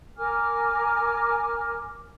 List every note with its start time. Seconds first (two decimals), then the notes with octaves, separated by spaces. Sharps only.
0.17 A#4 G#5 D6 F6